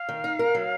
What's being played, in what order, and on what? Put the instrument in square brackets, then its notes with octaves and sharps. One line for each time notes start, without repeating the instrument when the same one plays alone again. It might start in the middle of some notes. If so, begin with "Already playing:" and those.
Already playing: [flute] F5
[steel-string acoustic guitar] D#3
D#4
A#4
F#3